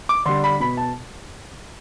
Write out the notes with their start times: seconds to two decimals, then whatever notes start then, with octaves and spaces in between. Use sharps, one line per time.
0.09 D6
0.26 D3 G3 C6
0.44 B5
0.60 B2 B5
0.77 A5